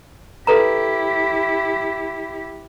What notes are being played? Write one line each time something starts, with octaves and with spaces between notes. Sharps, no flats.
E4 G4 A4 B4 A#5